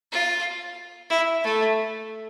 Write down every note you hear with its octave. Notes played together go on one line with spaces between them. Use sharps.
F4
E4
A3